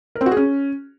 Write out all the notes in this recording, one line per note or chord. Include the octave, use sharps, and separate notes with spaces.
A#4
C4
F#4
G#4
C#4